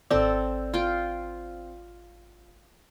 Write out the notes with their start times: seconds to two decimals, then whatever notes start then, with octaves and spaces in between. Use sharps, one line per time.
0.10 G#1 C4 A4 D5
0.74 F4 G5